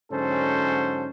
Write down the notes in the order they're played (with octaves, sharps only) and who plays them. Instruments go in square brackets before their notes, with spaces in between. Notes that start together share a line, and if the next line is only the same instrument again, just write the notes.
[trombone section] G#2 D3 F#3 C#4 A4 C5